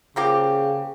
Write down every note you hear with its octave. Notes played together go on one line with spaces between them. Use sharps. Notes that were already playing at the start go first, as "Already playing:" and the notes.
C#3 F3 A#3 G4